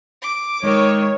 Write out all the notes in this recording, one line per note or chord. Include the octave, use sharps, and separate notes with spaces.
D6
D#3 G#3 C#5